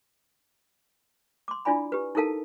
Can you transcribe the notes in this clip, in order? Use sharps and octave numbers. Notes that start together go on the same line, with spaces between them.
C6 D6
D4 E4 F4 D5 G#5 B5
G4 B4
D#4 E4 A4 A#4 F5 A5